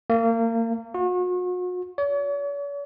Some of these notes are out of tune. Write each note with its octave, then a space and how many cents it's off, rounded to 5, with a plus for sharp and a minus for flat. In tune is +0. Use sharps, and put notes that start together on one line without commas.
A#3 -30
F#4 -40
C#5 +45